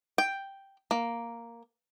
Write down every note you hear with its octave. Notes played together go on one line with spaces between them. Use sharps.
G5
A#3